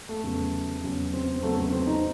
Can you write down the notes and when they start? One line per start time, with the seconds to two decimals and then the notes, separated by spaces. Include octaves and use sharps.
0.09 A3
0.23 E2 C#3 F#3
0.83 E2 C#3 F#3 C#4
1.14 C4
1.36 C4
1.43 E2 C#3 F#3 A3
1.58 C4
1.72 C4
1.87 D#4